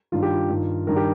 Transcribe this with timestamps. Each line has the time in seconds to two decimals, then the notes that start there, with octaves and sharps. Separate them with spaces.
0.12 G2 D#3 F4
0.23 G4
0.33 F4
0.49 G2 D#3
0.87 G2 D#3 A#4
0.96 G4